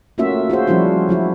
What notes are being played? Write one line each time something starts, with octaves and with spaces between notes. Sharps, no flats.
A3 A#3 C#4 F4 F#4 E5
F4 F#4 G#4 C5
F3 G3 C#4 D4 E4 F#4
F#3 E4 F#4